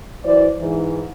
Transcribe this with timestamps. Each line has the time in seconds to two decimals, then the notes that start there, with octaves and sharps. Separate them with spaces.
0.24 E3 F#3 E4 C5 D5
0.59 G#2 E3